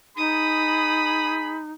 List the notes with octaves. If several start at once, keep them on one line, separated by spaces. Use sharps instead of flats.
D#4 G#4 B5 D#6